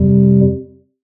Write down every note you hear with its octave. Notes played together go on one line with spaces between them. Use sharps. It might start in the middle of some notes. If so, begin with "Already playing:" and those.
Already playing: F2 C3 G3